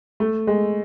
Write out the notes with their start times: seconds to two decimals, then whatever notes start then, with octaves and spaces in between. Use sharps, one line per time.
0.20 A3
0.47 G#3